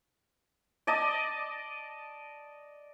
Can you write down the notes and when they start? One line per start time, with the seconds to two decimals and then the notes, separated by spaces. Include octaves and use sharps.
0.87 D5 D#5 A5